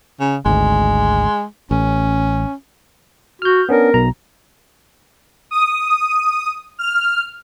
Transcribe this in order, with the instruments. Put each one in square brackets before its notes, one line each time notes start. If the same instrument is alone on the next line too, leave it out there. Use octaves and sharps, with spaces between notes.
[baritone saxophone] C#3
[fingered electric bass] G#1 D2 [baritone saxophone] G#3
[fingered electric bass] A1 [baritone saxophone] C#4
[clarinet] F#4 [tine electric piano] F6 G6
[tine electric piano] B3 C#4 D4 [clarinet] A#4
[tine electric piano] B1 B2 A#5
[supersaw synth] D#6
F6